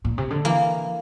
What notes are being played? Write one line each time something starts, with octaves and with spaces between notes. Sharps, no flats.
A#2
C3
D3
E3 A#3